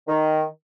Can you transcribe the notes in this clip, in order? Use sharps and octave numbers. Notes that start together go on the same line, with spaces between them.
D#3